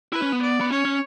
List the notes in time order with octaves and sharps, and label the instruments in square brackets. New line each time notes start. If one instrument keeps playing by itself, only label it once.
[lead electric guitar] E4 [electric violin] B4
[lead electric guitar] C#4
B3
[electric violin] D5
[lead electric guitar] B3
[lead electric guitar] C#4 [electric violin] C#5
[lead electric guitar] C#4